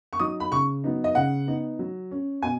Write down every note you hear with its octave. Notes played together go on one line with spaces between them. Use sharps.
C#6
F#3 D#4 D#6
B5
C#3 C#6
F#3 B3 D#4
D#5
C#3 F#5
B3 D#4
F#3
C#4
B2 G#5